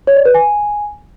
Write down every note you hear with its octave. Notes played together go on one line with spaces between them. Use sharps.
C#5
D5
B4
G#5